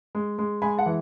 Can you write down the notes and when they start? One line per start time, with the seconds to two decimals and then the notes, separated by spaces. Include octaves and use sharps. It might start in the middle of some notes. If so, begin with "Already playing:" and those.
0.15 G#3
0.39 G#3
0.62 G#3 G#5 B5
0.78 F#5 A5
0.86 E3